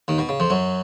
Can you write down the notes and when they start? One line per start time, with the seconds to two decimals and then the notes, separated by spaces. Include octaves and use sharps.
0.08 D#2 D#3
0.18 B2
0.29 C#3
0.40 F2 F3
0.50 F#2 F#3